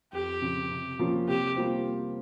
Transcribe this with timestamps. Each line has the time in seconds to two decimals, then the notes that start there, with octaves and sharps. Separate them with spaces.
0.13 F2 G4
0.41 C#3 F3 C4 F4
0.70 C3
0.99 F3 A#3 C#4 F4
1.28 C3 G4
1.56 G3 A#3 F4 C5